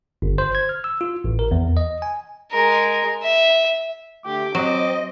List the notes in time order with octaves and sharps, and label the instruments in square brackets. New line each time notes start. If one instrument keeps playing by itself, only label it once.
[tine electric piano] G1
C5
G#6
F6
E6
F4
A1
A#4
E2
D#5
G#5
[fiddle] G#3 A#4
E5
[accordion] D3 A3 [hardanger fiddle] G4 [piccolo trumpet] D6
[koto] F#3 [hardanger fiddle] C4 [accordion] D#5